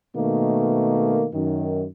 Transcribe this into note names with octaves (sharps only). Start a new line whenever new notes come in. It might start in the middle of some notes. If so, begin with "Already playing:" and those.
B2 D#3 A3 A#3
F#2 D#3